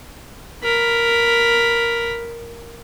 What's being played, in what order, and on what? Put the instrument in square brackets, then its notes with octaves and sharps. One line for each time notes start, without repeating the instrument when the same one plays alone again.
[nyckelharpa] A#4 B5